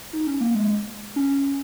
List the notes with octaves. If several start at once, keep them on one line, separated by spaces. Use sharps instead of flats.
D#4
C#4
A#3
G#3
C#4